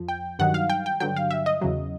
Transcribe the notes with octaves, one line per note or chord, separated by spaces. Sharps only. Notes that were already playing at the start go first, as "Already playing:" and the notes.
Already playing: F2 F3
G5
G2 D#3 F#3 F#5
F5
G5
G5
G2 D3 F#3 G5
F5
E5
D#5
E2 C#3 F#3